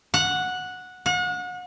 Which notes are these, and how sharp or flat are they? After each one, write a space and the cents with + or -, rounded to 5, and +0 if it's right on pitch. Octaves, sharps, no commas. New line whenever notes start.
F#5 -10
F#5 -35